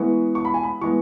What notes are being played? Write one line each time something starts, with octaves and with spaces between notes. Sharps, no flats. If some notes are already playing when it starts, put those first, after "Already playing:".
Already playing: E3 G#3 B3 C#6
C#6
B5
G#5
B5
E3 G#3 B3 C#6